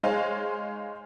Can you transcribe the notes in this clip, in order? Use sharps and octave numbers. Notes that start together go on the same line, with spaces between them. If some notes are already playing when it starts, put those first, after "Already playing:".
G#3 D#4 C5 C#5 F5 G#5